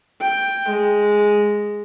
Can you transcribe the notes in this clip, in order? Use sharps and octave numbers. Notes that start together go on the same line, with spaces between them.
G5
G#3